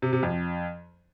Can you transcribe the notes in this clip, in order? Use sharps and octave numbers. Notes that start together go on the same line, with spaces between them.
C3
C3
F2